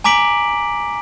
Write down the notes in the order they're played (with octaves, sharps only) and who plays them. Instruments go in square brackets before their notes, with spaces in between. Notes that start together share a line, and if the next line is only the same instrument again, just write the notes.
[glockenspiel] G#5 A#5 D6 B6 D7 F#7